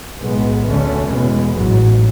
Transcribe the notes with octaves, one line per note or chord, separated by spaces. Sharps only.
B1 A2 G#3 B3
D2 D3 A3 C#4
E2 B2 G#3 B3
A1 G#2 F#3